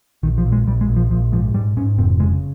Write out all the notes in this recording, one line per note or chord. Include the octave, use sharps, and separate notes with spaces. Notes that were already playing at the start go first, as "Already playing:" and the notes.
A#1 D#3
F3
A#1
G#3
A#1 G3
G#3
A#1
F3
A#1 F3
G#2 F3
G#2 G3
G#2 C#4
F1 C4
C#3 G#3